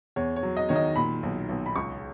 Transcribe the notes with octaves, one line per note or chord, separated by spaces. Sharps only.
E2 C#5
C#5
F#3
D#5
D#3 C#5
D#5
A#2 B5
B1
B1
B5
C#2 C#6